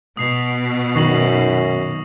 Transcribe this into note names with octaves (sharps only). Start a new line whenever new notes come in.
B2 D#6 C7 F7
F#2 D#3 C#6 A#6 F#7